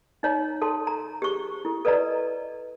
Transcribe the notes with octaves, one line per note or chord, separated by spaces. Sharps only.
D#4 C#5 A#5
A4 A5 C6
A#5
G4 G#4 C5 C#6
E4 A4
A4 B4 D5 D#5 A#5